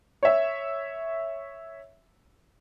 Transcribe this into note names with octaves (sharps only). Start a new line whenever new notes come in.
C#5 E5